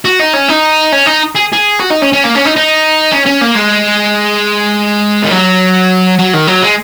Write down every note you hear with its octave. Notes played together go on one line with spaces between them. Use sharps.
F#4
D#4
C#4
D#4
C#4
D#4
G#4
G#4
F#4
D#4
C#4
C#4
A#3
C#4
D#4
D#4
C#4
C#4
A#3
G#3
D#3
F#3
F#3
D#3
F#3
G#3